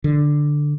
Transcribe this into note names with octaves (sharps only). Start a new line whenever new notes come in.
D3